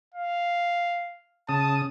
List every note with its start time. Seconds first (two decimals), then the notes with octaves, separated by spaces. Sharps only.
0.15 F5
1.49 C#3 A5 D#6